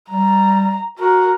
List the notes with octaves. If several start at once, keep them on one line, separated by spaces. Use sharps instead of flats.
G3 A#5
F#4 A#4